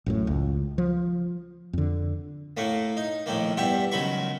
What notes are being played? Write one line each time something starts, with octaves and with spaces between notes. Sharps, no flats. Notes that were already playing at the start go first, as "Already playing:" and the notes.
A1 F#2 A2
C#2
F3
F2 D3
A2 A3 A#3
D#4
A#1 A2 D#3 A#3
E2 G2 G4 E5 F#5
C#2 D#3 F#3 B5 C#6